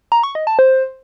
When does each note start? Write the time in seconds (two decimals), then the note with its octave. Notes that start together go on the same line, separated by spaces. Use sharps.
0.12 A#5
0.23 C#6
0.35 D#5
0.47 A5
0.59 C5